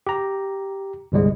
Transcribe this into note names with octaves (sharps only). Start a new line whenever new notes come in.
G4 A#5
G1 C2 G3 G#3